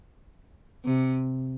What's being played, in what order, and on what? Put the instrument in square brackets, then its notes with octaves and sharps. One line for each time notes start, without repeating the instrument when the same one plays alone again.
[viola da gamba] C3